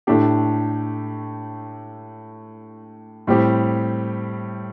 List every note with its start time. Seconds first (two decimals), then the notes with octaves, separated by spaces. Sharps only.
0.07 A2 A3 D4 G4
3.27 A2 G3 C4 G4